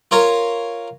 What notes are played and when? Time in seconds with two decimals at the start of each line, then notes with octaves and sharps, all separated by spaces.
0.11 F4 A#4 C#5 A#5